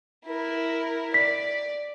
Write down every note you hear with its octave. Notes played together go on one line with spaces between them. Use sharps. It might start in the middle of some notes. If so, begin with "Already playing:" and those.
E4 A#4
D5 B6